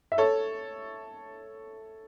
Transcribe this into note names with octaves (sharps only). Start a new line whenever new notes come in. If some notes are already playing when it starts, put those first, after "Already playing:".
E5
A4 C#5